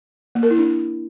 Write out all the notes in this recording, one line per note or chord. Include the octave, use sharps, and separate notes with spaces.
A#3
A#4
E4
D4